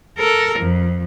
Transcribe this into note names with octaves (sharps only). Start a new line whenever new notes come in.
A4 A#4
F2